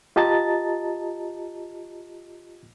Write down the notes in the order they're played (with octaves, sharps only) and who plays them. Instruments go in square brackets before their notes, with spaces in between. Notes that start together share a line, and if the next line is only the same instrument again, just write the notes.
[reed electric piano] F4 G4 D#5 A5 A#5 A6